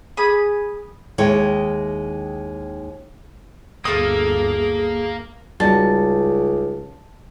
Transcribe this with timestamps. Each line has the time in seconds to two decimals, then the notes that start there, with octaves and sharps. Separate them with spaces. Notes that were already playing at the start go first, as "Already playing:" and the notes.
0.17 G#4 B5 D#6
1.18 D#2 D#3 G#3 E4 C#5
3.85 G1 D2 A#3 G#4 A4 F5 D#6
5.60 C#2 G3 D#4 F#4 A5